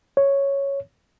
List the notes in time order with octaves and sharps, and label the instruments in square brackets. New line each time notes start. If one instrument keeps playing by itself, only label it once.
[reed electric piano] C#5